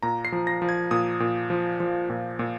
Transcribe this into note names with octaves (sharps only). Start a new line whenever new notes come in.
A#2 A#5
C7
F3
A#6
F3
G#6
A#2 D#6
A#2
F3
F3
A#2
A#2